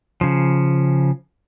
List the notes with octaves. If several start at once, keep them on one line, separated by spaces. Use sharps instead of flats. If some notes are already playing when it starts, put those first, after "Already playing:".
C#3 F3